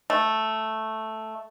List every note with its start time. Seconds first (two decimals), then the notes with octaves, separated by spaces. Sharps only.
0.10 A3